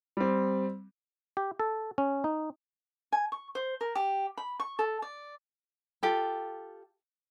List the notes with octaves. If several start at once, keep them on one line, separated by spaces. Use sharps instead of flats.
G3 C4
G4
A4
C#4
D#4
G#5
C#6
C5
A#4
G4
B5
C#6
A4
D5
F4 G4 A4